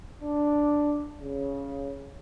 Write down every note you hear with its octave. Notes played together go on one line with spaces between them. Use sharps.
D4
C#3